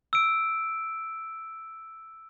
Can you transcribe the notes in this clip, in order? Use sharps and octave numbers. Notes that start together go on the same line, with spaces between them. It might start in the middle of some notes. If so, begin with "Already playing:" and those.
E6 D7